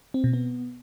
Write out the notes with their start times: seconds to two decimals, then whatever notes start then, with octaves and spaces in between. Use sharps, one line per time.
0.14 C4
0.24 B2
0.33 B3